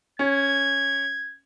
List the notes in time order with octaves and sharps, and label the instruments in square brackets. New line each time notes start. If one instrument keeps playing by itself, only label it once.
[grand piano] C#4 [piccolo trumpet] G#6